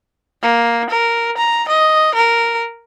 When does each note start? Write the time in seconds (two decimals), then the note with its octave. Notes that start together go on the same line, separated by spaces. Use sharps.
0.42 A#3
0.90 A#4
1.38 A#5
1.68 D#5
2.15 A#4